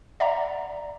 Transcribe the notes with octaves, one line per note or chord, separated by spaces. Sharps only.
D5 E5 F#5 A#5